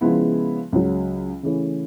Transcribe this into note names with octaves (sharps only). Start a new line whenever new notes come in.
C#3 F3 G#3 B3 E4
C#2 C#3 F#3
C#3 E3 A3 C#4